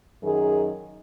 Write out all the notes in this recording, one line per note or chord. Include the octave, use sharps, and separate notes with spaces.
F#2 D#3 G#4